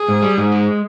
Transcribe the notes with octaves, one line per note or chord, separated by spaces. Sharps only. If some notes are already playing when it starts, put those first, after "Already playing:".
Already playing: G#4
G#2
G3
G#2
G#3